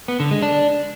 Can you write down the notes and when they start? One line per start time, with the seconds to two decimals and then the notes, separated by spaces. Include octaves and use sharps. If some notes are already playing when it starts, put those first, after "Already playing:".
0.08 B3
0.20 D3
0.31 G#3
0.42 D4